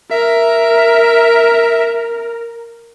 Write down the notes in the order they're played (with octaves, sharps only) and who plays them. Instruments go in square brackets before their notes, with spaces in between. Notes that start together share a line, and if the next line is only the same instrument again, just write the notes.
[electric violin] A#4 [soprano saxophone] E5